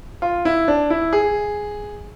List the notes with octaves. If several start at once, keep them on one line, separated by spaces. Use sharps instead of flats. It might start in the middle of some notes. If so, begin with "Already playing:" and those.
F4
E4
D4
E4
G#4